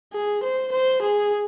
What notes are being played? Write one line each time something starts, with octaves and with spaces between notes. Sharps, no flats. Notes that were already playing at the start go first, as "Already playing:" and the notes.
G#4
C5
C5
G#4